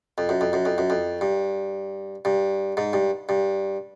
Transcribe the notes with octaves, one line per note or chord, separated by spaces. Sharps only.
F2
F#2
F2
F#2
F2
F#2
F2
G2
G2
G#2
G2
G2